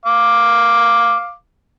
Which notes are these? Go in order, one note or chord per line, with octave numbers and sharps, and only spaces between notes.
F5 D6